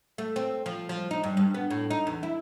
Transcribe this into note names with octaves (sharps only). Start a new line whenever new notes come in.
A3
C4
F3
F3
D#4
G2
G2
B3
A2
D#4
E2
E4